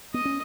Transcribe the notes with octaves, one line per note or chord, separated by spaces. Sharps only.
B3 D#5
C#4